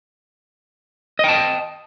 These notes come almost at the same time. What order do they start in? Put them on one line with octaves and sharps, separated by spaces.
D#5 G5 A5